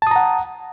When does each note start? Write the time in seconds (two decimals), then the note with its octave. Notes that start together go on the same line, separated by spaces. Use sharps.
0.02 A5
0.07 D#6
0.11 A#5
0.16 F#5